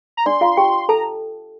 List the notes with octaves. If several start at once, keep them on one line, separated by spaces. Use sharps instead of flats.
A#5
D4 D5 C6
F4 F5
G4 G5
A4 A5 A#5